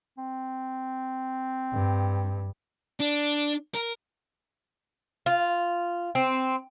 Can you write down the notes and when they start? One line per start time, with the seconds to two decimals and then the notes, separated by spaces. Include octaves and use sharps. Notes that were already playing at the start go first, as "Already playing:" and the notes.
0.18 C4
1.73 G2
3.00 D4
3.74 A#4
5.26 F4
6.15 C4